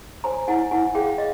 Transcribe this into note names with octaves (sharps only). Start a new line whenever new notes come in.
C5 G#5 A#5
E4 F#5 G#5
E4 F#5 G#5
G#4 F5 G5
D#5 F5